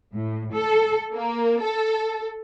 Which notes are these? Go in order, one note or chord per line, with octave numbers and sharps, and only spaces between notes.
A2
A4
A#3
A4